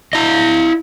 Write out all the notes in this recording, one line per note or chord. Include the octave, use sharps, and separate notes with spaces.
E4 D#5